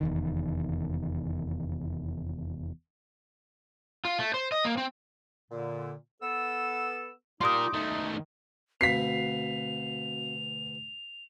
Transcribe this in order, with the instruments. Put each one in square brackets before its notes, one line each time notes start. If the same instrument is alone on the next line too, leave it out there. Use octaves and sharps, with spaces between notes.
[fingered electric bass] F1 E2 D#3
[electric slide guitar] F4
A3
C5
D#5
A#3
C4
[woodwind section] A#2 D3
B3 A4 E6
[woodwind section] G3 D#4 D6 [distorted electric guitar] F4 A#4 [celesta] C6 D#6
[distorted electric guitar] D#3 A3 [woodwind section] D#4
[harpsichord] D2 B2 [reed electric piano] C4 F#4 F5 [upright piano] B6 C7 [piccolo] F7